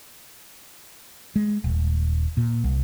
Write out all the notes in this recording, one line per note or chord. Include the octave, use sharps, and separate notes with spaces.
G#3
D#1
A#2
C2